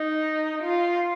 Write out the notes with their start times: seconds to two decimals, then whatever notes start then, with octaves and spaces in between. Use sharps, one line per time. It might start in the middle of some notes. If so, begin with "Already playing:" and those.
Already playing: D#4
0.63 F4